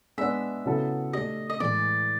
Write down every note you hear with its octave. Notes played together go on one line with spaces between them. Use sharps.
G#3 B3 D4 E5
C#3 F#3 B3 E4 A4
A3 D4 G4 D#5
D#5
A2 E3 G#3 D5